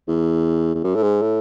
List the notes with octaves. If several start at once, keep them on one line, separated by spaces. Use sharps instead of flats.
E2
E2
F#2
A2
G#2
A2